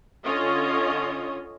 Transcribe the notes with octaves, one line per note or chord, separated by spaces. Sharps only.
D3 C#4 F4 C#5 D#5